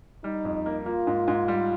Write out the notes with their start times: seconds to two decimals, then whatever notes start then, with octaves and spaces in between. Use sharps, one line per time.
0.24 G3 D#4
0.45 F2
0.66 A#3
0.86 A#3 F4
1.07 G#2
1.28 G#2
1.48 G3